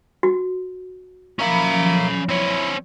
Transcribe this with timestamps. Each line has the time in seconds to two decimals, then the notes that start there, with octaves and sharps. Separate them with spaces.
0.23 F#4
1.39 F3 F#3 A#3 C#4 E5 B5
2.29 C4 E4 C#5